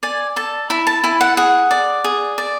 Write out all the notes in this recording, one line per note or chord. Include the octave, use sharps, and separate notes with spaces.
D5 G#5
A4 A5
E4 B5
A5
E4 G#5
F#5
G#4 F#5
D5
G#4
D5